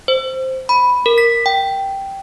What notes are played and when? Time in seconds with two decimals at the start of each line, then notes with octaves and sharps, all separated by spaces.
0.08 C5
0.69 B5
1.06 A#4
1.18 B6
1.46 G5